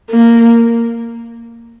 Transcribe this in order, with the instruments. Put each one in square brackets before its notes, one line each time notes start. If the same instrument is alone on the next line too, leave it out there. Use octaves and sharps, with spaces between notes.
[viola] A#3